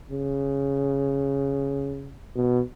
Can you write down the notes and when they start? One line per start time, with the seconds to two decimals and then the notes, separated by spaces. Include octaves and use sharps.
0.11 C#3
2.35 B2